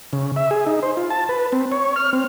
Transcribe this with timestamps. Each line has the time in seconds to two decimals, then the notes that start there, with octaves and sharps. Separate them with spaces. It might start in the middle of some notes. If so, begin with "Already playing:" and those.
0.13 C#3
0.36 E5
0.51 G#4
0.67 D#4
0.82 C5
0.97 F4
1.10 A5
1.29 B4
1.52 C4
1.72 C#5
1.96 F6
2.13 C4